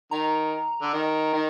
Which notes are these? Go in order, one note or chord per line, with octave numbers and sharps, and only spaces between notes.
D#3 A#5
D3
D#3
D#3